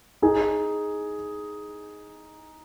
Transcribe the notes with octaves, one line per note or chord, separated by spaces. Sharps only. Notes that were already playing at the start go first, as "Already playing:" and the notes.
D#4 G#4